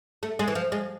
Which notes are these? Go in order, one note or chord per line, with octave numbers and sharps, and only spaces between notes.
A3
G#3
E3
F3
G#3